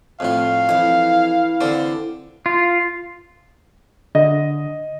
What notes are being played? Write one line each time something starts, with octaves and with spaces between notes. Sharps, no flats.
F2 A2 F4 F5
F2 E3 E4
D3 C4 D5
F4
D3 D#5